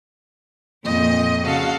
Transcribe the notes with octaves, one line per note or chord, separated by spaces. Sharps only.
F2 A#2 D#5
C#3 F#4 A4 F5